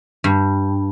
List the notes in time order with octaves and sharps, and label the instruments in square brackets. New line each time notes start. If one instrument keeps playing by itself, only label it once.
[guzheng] G2